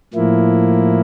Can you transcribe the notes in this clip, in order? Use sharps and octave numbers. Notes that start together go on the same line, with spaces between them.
A2 F3 A#3 E4